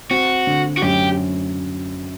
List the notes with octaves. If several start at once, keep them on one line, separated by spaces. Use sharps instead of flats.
C4 F#4
D3
F#4
F#2 G4